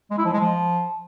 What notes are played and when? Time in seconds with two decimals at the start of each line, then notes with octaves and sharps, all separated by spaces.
0.11 G#3
0.18 E4
0.26 F3
0.33 G#3
0.40 F3